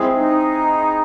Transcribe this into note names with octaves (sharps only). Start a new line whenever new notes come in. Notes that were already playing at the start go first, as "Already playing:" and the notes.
Already playing: G#3 C4 E4 G#4
D#4